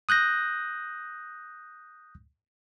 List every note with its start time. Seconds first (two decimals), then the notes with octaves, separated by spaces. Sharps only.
0.09 D#6 F#6 G6 A#6